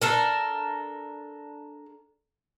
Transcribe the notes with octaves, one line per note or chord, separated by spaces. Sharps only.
D4 A4 A#4